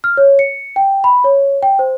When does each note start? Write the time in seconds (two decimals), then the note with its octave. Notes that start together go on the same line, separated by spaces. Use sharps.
0.04 F6
0.17 C#5
0.39 C#7
0.76 G5
1.04 B5
1.24 C#5
1.63 G5
1.79 C5